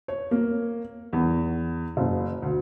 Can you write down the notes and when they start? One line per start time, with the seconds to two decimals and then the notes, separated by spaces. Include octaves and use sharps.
0.08 C#5
0.31 A#3
1.13 E2
1.97 F#1
2.42 D2